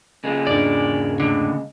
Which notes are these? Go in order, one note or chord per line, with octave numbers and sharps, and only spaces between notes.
C#3 G#3 A#3
E2 G#2 D4 A#4 D5
A2 D3